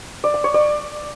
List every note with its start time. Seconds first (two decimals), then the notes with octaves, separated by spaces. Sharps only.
0.24 D5
0.34 E6
0.44 C#5
0.54 D5